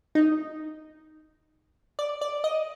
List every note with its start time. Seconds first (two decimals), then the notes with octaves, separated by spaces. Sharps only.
0.15 D#4
1.99 D5
2.21 D5
2.44 D#5